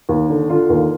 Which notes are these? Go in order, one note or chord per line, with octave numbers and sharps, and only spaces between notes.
D#2
D3
D3 F4
D#2